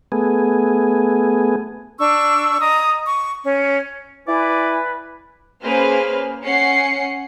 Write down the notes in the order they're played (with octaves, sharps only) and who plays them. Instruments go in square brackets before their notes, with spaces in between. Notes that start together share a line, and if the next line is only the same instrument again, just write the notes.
[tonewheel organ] A3 B3 G#4
[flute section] D4 C#6 E6
D#5 A#5 D#6
C#6
C#4
[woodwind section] E4 G#5 [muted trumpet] B4 [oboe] D5
[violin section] A#3 C#4 G#4 B4 C5 F6
C#4 F#5 C7 C#7